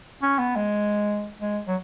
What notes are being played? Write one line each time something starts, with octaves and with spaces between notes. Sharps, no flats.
C#4
B3
G#3
G#3
F#3